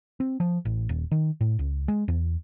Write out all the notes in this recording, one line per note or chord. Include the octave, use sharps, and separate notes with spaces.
C4
F3
A1
D#1
D#3
A2
C#2
G#3
E2